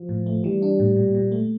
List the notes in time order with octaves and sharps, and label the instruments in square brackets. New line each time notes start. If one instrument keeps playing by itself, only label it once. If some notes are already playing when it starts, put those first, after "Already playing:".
Already playing: [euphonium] F3
[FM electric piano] A2
A3
[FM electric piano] E3 [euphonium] G3
[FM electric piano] D4
A2
A#2
A#2
A3